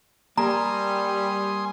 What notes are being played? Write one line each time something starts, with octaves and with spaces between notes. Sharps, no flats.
G3 A#3 G#5 A#5 C6 D#6